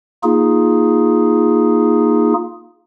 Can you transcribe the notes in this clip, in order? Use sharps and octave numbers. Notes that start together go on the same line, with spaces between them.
A#3 D#4 F4 G#4